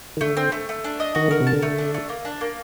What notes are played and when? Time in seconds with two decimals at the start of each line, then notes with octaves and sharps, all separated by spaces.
0.17 D#3
0.21 D3 A3
0.37 C4
0.52 A3
0.69 A3
0.84 D4
1.00 D#5
1.15 D#3 F#4
1.28 D3 A#4
1.40 C3
1.47 A5
1.53 D3
1.62 A3
1.78 D4
1.94 A3
2.09 A#3
2.25 D4
2.41 A#3